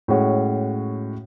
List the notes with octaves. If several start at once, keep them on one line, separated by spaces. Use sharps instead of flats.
A2 G#3 C#4 F#4